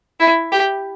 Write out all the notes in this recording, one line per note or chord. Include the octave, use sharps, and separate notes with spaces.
E4
G4